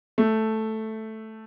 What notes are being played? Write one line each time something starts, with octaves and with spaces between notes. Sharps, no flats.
A3